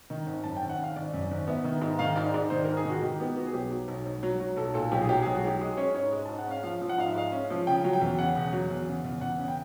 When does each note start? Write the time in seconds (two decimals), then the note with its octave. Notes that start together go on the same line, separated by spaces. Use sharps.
0.10 D#3
0.26 G#1
0.44 F#2 A5
0.57 G5
0.62 G#1
0.70 F#5
0.78 G#1 F5
0.96 G#1 D5
1.13 F#2
1.21 D5
1.31 G#1
1.47 B3 E5
1.64 D#3
1.81 G#2
1.99 D#3 F5
2.16 G#2 D5
2.34 G#2 D5
2.50 D#3 C5
2.64 G#2 A#4
2.77 G#4
2.85 D#3 F#4
3.02 D#3 G4
3.20 B3 G4
3.36 B3 F#4
3.47 G#4
3.53 B1 G4
3.71 F#3
3.88 B1
4.06 B1
4.23 F#3
4.40 F#3
4.57 B1 A4
4.74 A#2 A4
4.92 B1 G4
5.01 G#4
5.09 F#3 G4
5.22 B1 G#4
5.35 F#4
5.44 F#3 G4
5.61 G#3 G#4
5.77 C#4 C#5
5.94 G#2 C#5
6.13 G#3
6.26 G#2 A5
6.38 F#5
6.47 C#4 F5
6.63 F3 F5
6.81 F3
6.89 F#5
6.98 G#2 F5
7.08 E5
7.16 G#3 F5
7.32 C#4
7.50 F3
7.67 C#3 G5
7.84 F#3
7.93 G5
8.01 E2
8.19 C#3 F#5
8.35 E1
8.52 F#3
8.70 E2
8.88 C#3
9.04 E2
9.21 E2 F#5
9.38 C#3
9.48 G5